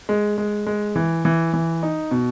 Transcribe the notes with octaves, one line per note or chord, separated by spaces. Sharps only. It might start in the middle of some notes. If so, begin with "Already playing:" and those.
G#3
G#3
G#3
E3
E3
E3
D#4
B2